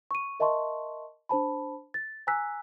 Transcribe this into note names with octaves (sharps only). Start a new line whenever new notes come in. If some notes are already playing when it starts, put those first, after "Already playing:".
C#6 D#7
A#4 D#5 E5 A5 C6 C#6
D4 C5 A5 B5
A6
G#5 A#5 E6 F#6 B6